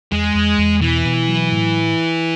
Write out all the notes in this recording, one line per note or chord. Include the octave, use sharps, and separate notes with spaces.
E2 G#3
E2
E2
B2 E3
B2
F#3
A2